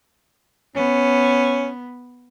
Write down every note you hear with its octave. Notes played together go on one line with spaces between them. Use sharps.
B3 C#4